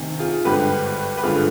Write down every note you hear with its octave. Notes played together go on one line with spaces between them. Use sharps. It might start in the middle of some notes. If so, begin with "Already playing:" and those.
Already playing: D2 C3 D#3
F4 G#4
G#1 G2 D3 G4 B4
B4
G#1 G2 D3 F4 G#4